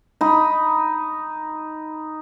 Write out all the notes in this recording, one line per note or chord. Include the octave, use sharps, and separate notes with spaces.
D#4 B5